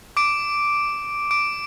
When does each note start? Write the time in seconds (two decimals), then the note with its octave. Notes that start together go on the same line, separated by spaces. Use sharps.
0.17 D6 D7
1.31 D6 D7